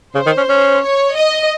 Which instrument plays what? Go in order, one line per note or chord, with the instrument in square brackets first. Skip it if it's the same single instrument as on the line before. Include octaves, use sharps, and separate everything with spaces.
[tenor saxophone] C#3 [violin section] C5
[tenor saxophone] D#3
C#4
C#4
[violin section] C#5
D#5